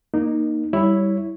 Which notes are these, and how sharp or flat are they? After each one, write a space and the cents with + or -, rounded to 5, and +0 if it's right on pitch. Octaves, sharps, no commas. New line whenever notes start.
A#3 +10 D#4 -15
G3 +0 E4 +0 C#5 +0